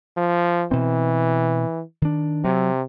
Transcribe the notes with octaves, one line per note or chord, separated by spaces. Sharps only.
F3
B2 E3 C4
D#3 D4
C3 F#3